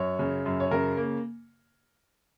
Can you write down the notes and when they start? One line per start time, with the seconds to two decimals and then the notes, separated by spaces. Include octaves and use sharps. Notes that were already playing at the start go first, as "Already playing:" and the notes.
Already playing: F#2 C#5
0.19 C#3
0.46 F#2
0.60 C#5
0.71 C#3 A#4
0.97 A#3